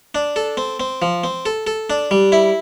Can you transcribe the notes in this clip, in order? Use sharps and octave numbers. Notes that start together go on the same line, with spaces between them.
D4
A4
C4
C4
F3
C4
A4
A4
D4
G3
E4